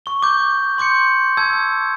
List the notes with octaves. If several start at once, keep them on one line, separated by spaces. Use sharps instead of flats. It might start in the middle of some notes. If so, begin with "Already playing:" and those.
C#6 G7
D6 G6
C6 D6 G6 C#7
A5 E6 G#6